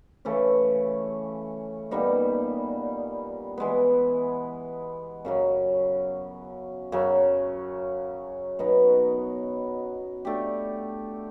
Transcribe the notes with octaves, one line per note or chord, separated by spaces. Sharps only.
C#3 E3 A3 C#4
A#2 G3 B3 D#4
E3 G#3 B3
F#2 C#3 F#3
F#2 C#3 F#3
B2 F#3 B3 D#4
A3 D4 G4